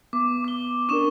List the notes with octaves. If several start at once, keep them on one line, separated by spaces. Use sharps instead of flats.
B3 D6
D6 G7
C#4 D4 A#4 C#6 D#6 E7